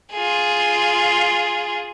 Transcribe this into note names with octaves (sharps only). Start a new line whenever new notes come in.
F4 G#4